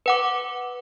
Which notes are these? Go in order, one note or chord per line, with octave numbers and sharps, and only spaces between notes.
B4 F#5 D6